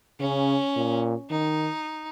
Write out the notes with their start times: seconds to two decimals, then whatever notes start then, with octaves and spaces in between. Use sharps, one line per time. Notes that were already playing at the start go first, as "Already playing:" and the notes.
0.20 C#3 C#4
0.76 A#2
1.30 D#3 D#4